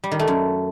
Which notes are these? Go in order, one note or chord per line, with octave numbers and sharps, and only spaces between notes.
G3
D#3
A3
F#2